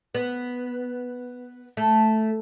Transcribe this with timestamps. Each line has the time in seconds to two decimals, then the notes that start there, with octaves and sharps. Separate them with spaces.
0.15 B3
1.77 A3